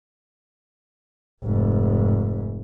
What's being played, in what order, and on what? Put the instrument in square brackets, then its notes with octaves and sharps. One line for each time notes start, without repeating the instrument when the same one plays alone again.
[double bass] F1 G#2